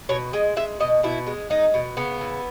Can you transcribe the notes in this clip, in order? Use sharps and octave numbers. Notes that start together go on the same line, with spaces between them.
B2 C#5
G#3 D#5
G#3 E5
B2 D#5
B2 E4
G#3
G#3 D#4
B2
C#3 B3
E3